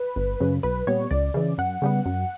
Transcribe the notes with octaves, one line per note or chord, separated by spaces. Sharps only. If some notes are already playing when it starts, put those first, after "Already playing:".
Already playing: B4
G1
F#2 C#3
B1 B4
A#2 G3 B3 C#5
C#2 D5
C#3 E3
F#2 F#5
C#3 G3 B3
F#2